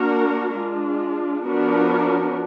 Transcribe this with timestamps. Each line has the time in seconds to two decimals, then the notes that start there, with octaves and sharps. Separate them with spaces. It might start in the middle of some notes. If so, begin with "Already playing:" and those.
Already playing: A#3 D4 F#4 A#4
0.54 G#3 D4 F4
1.44 F3 B3 D4 F#4 A#4